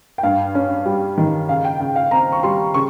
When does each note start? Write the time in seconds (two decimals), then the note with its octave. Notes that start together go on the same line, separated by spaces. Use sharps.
0.18 G5
0.23 G2 F5
0.55 C#4
0.86 G3
1.18 D#3
1.49 C#3 F5
1.65 G5
1.81 C#3 G5
1.96 F5
2.11 C4 A#5
2.32 C#6
2.43 G3 C6
2.74 C#3 C#6